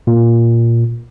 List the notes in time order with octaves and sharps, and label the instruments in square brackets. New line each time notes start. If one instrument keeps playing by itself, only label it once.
[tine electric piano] A#2